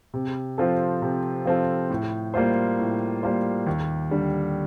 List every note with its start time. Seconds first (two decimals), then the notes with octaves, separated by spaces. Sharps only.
0.14 C3
0.58 F3 C4 F4 A4
1.02 C3
1.46 F3 C4 F4 A4
1.90 A2
2.34 G3 A#3 F4 C5
2.79 A2
3.23 G3 A#3 F4 C5
3.67 D#2
4.11 D3 G3